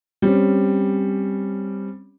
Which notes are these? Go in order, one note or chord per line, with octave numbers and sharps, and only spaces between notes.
G3 C4 C#4